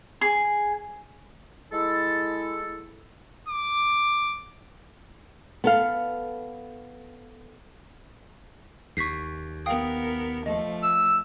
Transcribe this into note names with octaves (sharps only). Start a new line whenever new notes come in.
G#4
G#3 E4 A4
D6
B3 A4 F5
D#2 C#6 B6 C7
B3 A#4 F5 G5 D#6
F3 A3 D#5
E6